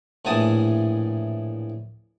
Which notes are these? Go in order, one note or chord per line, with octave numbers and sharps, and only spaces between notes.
A#1 A2 E3 G#5 A5 D#6